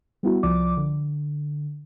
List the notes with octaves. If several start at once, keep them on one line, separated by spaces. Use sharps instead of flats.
G3 B3 E4 F#4
C2 F3 D5 D6
D3